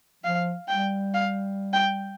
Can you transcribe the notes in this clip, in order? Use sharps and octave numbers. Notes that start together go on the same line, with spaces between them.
F3 F5
G3 G5
F5
G5